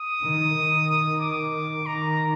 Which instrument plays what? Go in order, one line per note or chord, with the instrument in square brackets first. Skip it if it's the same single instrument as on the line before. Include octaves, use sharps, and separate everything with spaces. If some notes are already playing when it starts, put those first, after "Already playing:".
Already playing: [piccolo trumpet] D#6
[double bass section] D#3
D#3
[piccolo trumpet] D6
[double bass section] D#3 [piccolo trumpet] A#5